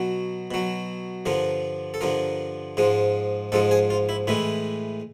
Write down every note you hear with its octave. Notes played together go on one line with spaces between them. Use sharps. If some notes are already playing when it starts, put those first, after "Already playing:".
Already playing: B2 F#3
B2 F#3
G2 D3 F3 A#4
A4
G2 D3 F3 A#4
G#2 F3 G#3
G#2 F3 G#3 A4
G#4
F4
E4
A2 E3 G#3 E4